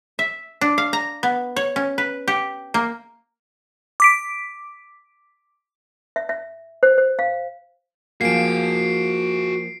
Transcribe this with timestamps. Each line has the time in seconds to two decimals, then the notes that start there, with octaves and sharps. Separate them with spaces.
0.19 E5
0.61 D4
0.78 F5
0.93 A#5
1.23 B3
1.56 C#5
1.76 C#4
1.98 B4
2.28 G4
2.74 A#3
4.00 D6 B6 D7
6.16 E5
6.29 E5
6.83 C5
6.98 C5
7.19 F5
8.21 F3 A#3 F#4 G#4 C7 D7